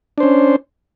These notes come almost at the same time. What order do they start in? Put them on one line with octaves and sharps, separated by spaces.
D4 C5 C#4